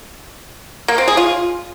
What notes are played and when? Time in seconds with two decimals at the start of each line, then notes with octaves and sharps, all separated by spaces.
0.88 A#3
0.98 C4
1.08 G#4
1.17 F4